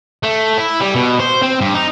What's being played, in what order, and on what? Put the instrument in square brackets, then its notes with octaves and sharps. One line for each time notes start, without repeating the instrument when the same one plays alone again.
[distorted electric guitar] A3
E4
G3
B2
C5
C4
G2
D#4